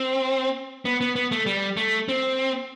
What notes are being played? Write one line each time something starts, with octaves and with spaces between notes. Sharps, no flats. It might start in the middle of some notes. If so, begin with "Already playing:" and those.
Already playing: C4
B3
B3
B3
A3
G3
A3
C4